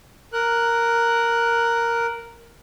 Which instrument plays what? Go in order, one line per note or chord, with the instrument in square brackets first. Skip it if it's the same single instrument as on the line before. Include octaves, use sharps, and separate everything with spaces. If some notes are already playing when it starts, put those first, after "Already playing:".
[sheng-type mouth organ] A#4 F#6